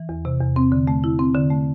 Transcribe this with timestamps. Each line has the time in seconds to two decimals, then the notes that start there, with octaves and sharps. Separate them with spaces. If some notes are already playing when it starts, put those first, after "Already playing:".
Already playing: E3
0.09 E2
0.25 C3
0.40 E2
0.56 C4
0.72 D3
0.87 A3
1.04 E4
1.19 C4
1.35 D3
1.51 A3